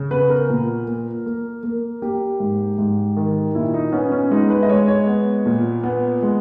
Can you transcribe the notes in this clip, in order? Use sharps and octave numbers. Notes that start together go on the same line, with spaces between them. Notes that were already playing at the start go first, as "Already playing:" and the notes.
Already playing: C#3
B3 B4
A#4
A#2
A#3
A#3
A#3
A#3 G4
G#2
G#2
D#3
A#2 E4
D#4
B3 C#4
C#4
G#3 D#4
B4
D#5
G#3 C#5
C#5
B3
A#2
B3
G#3